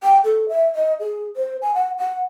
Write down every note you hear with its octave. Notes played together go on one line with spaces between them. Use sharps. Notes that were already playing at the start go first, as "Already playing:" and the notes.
G5
A4
E5
D#5
G#4
C5
G#5
F#5
F#5